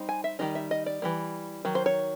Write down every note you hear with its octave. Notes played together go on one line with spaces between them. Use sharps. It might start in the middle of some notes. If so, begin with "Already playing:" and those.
Already playing: G3 C4 D#4
G#5
E5
D#3 G3 C4 D#4 D#5
E5
D#5
D5
E3 G3 A#3
D#3 F#3
C5
C#5